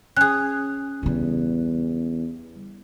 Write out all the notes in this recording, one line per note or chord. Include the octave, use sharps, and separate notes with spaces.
C#4 G#4 F#6
E2 C#3 G3